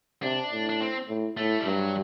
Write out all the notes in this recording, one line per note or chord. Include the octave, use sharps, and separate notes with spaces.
C3 D4
A2
D4
C4
A2
A2 A3
G3
G2 F#3